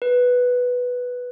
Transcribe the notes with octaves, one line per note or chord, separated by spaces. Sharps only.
B4